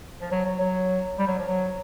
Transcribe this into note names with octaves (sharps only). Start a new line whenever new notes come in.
F3
F#3
F#3
F#3
G3
F#3
F3
F#3